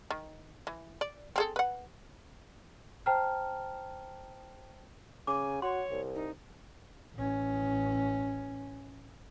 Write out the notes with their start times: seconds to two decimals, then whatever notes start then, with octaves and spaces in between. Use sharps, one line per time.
0.11 D#3
0.67 E3
1.01 D5
1.36 C4 G#4 A4
1.56 B4 F#5
3.06 C5 G5 A5 A#5 F6
5.27 C#3 G#5 D6
5.62 F#4 C#5 C6
5.90 C2
6.15 D#4
7.16 A1 C#4